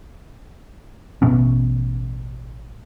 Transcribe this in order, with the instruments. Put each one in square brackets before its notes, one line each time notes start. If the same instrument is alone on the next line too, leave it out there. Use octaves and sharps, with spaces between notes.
[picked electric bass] A1 B2 B3 C#4